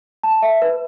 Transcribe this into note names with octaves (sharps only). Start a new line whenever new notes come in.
A5
E5
B4